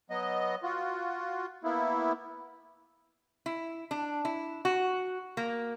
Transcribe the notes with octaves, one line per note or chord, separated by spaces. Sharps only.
F#3 B3 D#5
F4 F#4
A#3 B3 E4
E4
D4
E4
F#4
A#3